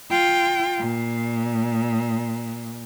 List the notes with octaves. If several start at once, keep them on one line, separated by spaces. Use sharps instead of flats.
F4 G5
A#2